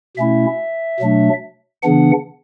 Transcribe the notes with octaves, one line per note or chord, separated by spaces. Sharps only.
B2 A3 C#4 E4 E5
B2 F#3 A3 D4
C#3 E3 B3 D4 F#5